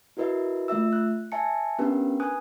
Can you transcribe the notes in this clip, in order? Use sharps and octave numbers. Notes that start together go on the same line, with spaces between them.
E4 F#4 A#4 B4 D#5 E5
A3 F4 E5 E6
F#6
E5 G#5 A5 C#7
B3 C#4 D4 G4 A#4 B4
B4 G#5 D#6 F#6